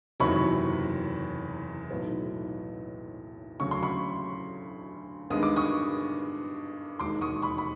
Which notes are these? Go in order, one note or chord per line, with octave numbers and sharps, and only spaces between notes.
F#1 E2 C3 D#3 F#3 B5 C#6
B1 A2 F#3 B3 D#4
D2 C#3 F#3 C#6
C6
B5 C#6
G2 D#3 G#3 B3 D#6
D6
C#6 D#6
E1 D#2 D#3 G#3 C6 D6
C#6 D#6
B5 C#6
B5